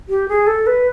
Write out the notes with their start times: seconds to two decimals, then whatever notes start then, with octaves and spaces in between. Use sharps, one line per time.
0.09 G4
0.28 G#4
0.47 A4
0.67 B4